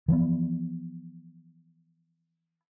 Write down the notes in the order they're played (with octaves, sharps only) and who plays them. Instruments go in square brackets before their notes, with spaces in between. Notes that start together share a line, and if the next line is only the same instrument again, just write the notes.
[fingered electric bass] E3 F3 A#3 B3